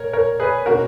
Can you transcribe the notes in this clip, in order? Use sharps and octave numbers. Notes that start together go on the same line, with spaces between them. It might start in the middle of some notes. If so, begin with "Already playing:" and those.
Already playing: A#2 A#4 C#5
A#4 C#5
G#4 B4
B2 A#3 C#4 F#4 A#4